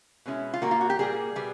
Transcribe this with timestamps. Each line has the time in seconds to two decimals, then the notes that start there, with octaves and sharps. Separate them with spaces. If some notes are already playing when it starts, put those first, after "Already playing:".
0.26 B2 G#3 C#4 E4
0.53 F4
0.62 A#2 G3 A#3 F#4
0.71 F4
0.81 F#4
0.90 G4
0.99 A#2 G3 A#3 G#4
1.36 B2 G3 B3